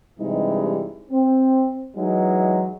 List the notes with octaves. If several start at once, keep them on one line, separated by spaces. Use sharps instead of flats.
G2 C3 E3 G3 G#3 D#4
C4
E3 F#3 G#3 D#4